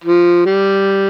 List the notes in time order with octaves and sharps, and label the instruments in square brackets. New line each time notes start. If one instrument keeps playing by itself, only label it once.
[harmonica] F3
G3